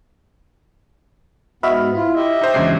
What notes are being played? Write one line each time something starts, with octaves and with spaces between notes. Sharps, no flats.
G#2 B3 F#4 D#5 E5 B5 F6
E4 F4
G4 D#5 E5
D#4 C5 G5
E2 G#2 C#3 F#3 D4 C7